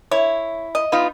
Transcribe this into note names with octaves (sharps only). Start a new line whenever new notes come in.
E4 C#5
D#5
B3 D#4 F4